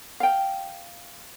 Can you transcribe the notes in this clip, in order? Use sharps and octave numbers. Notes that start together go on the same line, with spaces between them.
F5 G5